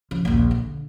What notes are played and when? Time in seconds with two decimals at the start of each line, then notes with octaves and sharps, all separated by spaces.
0.11 C#3 F3
0.25 A#1 D#2
0.51 D3